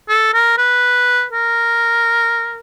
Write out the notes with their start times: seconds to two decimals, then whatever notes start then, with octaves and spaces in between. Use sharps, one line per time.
0.09 A4
0.34 A#4
0.58 B4
1.32 A#4